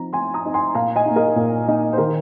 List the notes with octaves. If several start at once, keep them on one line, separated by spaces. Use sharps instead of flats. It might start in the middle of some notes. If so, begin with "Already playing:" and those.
Already playing: F3 C4 D#4 A#5
F3 G#5 C6
A#5 D#6
C4 D#4
G#5 C6
A#2 F5 A#5
D#5 G#5
A#3 D#4
A#4 D#5
A#2
A#3 D#4
C5
D#3 A#4